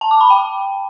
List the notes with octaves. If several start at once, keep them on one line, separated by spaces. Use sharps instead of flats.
A5
D6
B5
G5